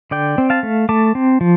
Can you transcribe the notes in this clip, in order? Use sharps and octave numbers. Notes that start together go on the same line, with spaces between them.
D3 D5 G5
C4
F5 A5
A3
A3 A5 D6
C4
F3